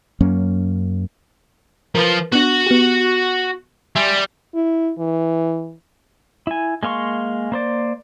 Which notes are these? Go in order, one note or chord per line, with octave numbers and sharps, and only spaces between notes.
F#2 F#3 A#3 C#4
F3 F4 A#4 B4
B3 D4 F#4 F#5
B3 G4
G3 E5 G#5 C6
E4
E3
E4 G#5
G#3 A#3 F5 C6 C#6
A#3 C5 D5